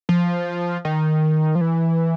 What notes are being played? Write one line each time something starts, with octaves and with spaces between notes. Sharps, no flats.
F3
D#3
F3
E3